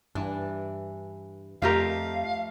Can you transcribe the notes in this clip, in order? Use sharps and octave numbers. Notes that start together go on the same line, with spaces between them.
G2 E3 D4
F2 F3 A3 F4 G4 A#4 D#5 F5